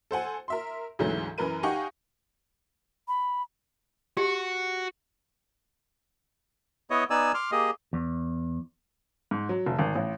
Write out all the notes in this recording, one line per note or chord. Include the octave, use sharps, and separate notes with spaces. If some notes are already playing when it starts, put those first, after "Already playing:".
A4 C5 F#5 G#5
A#4 E5 C6
D2 G#2 C#3 E3 F#3 A3
F#2 E3 A#4 B4 D#7
D#4 G4 F5 F#5 G#5 C#6
B5
F#4 G4
B3 E4 C#5 D#5
B3 D#4 D5 G#5 E6
C6 D6 F6
A#3 G4 G#4 D#5
E2
G#2
F#3
F1
G#1
A1